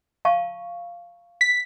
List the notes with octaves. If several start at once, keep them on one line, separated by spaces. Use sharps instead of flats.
F5 A5 C#6
B6